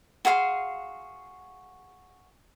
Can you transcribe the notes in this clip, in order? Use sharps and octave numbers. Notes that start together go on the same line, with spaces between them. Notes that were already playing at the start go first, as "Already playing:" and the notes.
F#4 G#4 F5 C6